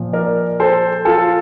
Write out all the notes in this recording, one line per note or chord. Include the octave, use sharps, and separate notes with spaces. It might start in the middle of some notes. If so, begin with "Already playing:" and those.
Already playing: A#2 F3
A#4 D5
A4 C5
F4 A4